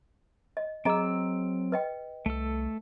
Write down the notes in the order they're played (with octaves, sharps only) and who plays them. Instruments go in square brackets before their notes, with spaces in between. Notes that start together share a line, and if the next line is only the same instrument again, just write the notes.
[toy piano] D#5
[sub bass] F#3 [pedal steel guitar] C4 E6 [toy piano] G#4 D#5 A#5
[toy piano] B4 D#5 G5
[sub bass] C2 [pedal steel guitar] A3 A4